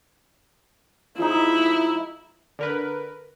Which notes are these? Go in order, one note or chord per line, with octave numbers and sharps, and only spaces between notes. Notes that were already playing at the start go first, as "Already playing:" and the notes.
F3 G#3 D#4 E4
D3 A#4 B4